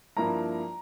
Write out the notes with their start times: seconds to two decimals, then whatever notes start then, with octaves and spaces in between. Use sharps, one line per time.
0.16 G2 F3 A#3 E4 A#5